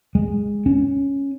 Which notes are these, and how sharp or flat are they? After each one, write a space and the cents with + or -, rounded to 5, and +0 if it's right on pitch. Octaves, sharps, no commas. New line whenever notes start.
G#3 -15
C#4 +0